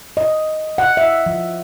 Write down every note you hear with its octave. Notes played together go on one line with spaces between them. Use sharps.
D#5
F#5
E5
F3